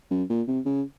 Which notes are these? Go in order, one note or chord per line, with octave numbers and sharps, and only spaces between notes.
F#2
A#2
C3
C#3